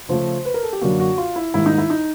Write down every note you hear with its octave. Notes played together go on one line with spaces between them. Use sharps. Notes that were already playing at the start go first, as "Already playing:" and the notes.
C#3 F3 A3 C5
B4
A#4
A4
G4
F#2 D3 F#3 A#3 F#4
F#4
F4
E4
G#2 D#3 G3 A#3 E4
D#4
E4
D#4